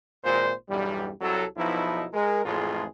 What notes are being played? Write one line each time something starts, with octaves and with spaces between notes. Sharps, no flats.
G#1 A#2 C5
B1 E2 G2 G3
C2 F#3 A4
B1 B2 F3 D#4 E4
G#3 A#4
A1 F2 A2 G#3 F4 G#4